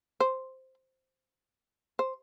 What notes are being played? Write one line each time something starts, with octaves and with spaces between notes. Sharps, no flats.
C5
C5